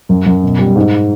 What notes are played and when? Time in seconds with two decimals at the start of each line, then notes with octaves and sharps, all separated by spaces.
0.09 F#2
0.26 F#2
0.43 B2
0.59 G3
0.76 G#2